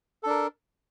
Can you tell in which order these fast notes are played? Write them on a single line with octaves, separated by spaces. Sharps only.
A4 D4 A#4